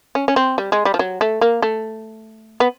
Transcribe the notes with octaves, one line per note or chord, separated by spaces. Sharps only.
C#4
C#4
C4
G3
G#3
G3
F3
F#3
A3
A#3
A3
B3